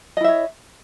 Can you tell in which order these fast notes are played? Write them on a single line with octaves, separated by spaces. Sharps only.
D#5 E4 E5 C#5